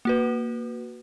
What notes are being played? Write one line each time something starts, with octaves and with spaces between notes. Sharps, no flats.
A#3 F#4 B4